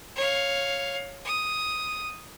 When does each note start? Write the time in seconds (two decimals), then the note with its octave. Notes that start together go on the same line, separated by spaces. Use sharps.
0.16 C#5 F5
1.25 D#6